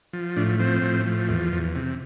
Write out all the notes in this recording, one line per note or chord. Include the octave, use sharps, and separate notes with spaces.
F3
A2 D4
F3 C4
A2
F3
E2
E2
C3